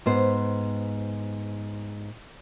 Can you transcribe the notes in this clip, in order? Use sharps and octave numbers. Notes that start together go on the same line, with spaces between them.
G#2 B3 C5